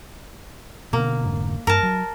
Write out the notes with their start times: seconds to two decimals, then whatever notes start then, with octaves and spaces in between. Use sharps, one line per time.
0.93 B2 D3 A#3
1.24 F1 G#2 D3
1.67 G2 A#4 A5
1.83 F#3